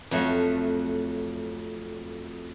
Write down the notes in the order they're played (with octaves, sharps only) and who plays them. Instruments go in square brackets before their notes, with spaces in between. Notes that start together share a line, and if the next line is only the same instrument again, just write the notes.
[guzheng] F2 F#3 A3